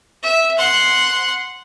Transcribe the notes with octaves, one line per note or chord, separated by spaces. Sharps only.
E5
F#5 C6